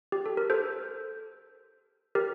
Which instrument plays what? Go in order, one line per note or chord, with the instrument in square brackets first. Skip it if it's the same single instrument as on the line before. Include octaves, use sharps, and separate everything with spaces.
[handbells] G4
A4
A#4
A4 C5
G4 A#4